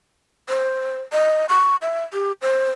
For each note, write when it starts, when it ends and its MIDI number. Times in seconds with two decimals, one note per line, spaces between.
0.49 1.01 72
1.13 1.46 75
1.49 1.76 85
1.82 2.03 76
2.13 2.32 67
2.42 2.71 72